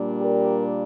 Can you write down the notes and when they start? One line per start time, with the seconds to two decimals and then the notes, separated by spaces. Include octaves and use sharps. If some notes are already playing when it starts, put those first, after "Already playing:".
Already playing: A#2 G3 A#3 D4
0.20 G4 A#4